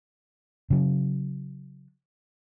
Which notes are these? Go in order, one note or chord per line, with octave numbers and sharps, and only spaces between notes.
C#3 F#3